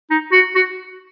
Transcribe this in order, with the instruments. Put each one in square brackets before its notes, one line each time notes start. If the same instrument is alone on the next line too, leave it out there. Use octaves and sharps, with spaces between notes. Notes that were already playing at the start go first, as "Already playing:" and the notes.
[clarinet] D#4
F#4
F#4